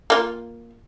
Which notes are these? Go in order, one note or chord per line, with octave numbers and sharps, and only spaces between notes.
A#3 F4